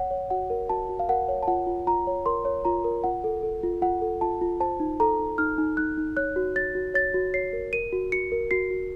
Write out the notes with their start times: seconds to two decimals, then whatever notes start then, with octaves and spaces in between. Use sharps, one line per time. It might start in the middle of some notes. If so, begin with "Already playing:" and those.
Already playing: C#5 F#5
0.11 C#5
0.30 F#4 F#5
0.50 A#4
0.69 F#4 A5
0.89 F#4
0.99 F5
1.09 A#4 F#5
1.29 C#5
1.43 A5
1.48 F4 F#5
1.67 F4
1.87 F4 A#5
2.07 C#5
2.26 A#4 C6
2.45 C#5
2.65 F4 A#5
2.84 A#4
3.04 F4 F#5
3.24 A4
3.43 A4
3.63 F4
3.82 F4 F#5
4.02 A4
4.21 F4 A5
4.41 F4
4.60 C5 A5
4.80 D#4
5.00 A4 A#5
5.19 D#4
5.38 D#4 F6
5.58 D#4
5.77 D#4 F#6
5.97 D#4
6.17 C#5 F#6
6.36 F#4
6.56 C#5 A6
6.75 F#4
6.94 C#5 A6
7.14 F#4
7.34 C#5 C7
7.53 A#4
7.73 A#4 D#7
7.92 F#4
8.12 F#4 C#7
8.32 A#4
8.51 F#4 C7
8.71 F#4